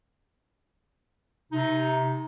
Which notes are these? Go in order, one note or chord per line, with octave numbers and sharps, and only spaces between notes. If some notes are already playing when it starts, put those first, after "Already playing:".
C3 D#4